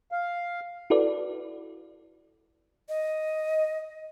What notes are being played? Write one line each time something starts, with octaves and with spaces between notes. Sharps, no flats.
F5
E4 F#4 A4 B4 D5
D#5